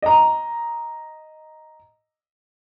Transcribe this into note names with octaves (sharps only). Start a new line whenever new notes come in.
D#5 A#5